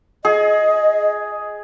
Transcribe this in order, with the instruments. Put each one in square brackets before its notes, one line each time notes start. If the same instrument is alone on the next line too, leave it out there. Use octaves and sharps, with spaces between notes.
[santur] G#4 [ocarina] D#5